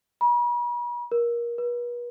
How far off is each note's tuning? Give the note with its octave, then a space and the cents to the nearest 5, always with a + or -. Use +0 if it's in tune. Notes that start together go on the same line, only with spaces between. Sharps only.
B5 -45
A#4 +25
B4 -40